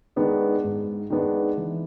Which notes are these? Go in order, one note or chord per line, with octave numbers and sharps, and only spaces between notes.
D#3 G#3 B3 D4
G#2
D#3 G#3 B3 D4
E3